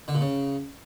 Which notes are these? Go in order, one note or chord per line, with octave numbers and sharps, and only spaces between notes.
D3
A#2
C#3